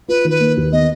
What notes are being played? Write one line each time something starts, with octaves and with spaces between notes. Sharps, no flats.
F4 B4
D#3
B4
A#3
D#2
B3 D#5